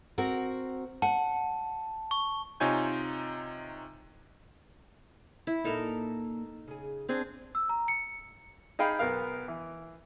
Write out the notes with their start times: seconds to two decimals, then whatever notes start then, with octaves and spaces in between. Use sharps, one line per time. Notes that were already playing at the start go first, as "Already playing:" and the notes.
0.18 C4 F#4 A#4
1.02 F#5 A5
2.11 C#6
2.60 C3 D#4 F4 C#5 G#5 G6
5.47 E4
5.64 A#2 A#3 D#4 A4 A#4
6.68 C#3 G#4
7.09 C4 D4 G#4
7.55 E6
7.69 A#5
7.88 C#7
8.79 D#4 G#4 F5 G5 B5
8.99 B1 B3 A#4 F5
9.48 E3